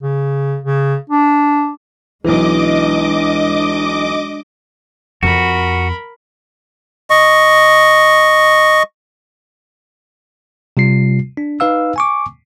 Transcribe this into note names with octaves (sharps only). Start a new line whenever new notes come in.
C#3
C#3
D4
B1 E3 G#3 D4 D#5 D6
F2 C4 F#4 A#4 B5
D#5 C#6
C3 G3 F4 C7
D4
D#4 B4 F5 E6
G#5 C#6 D6